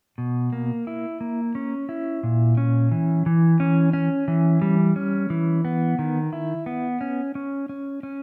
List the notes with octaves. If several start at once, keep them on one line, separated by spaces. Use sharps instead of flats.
B2
A#3
E4
A#3
C#4
E4
A#2
C#4
E3
E3
C#4
C#4
E3
G3
C#4
E3
B3
D#3
E4
B3
C#4
C#4
C#4
C#4